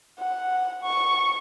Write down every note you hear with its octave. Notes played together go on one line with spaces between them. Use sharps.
F#5
C#6